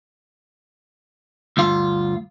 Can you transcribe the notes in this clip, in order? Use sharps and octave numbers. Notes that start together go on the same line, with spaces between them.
D2 G2 F4